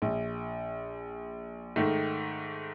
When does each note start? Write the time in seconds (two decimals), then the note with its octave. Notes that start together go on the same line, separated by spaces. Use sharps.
0.02 A#1
1.76 G#2 D#3 A3